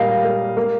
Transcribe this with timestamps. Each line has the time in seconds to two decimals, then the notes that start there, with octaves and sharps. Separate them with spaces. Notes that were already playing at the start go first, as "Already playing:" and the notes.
Already playing: A#2 G3 A#3 D#5 F5
0.24 A#3
0.57 A#3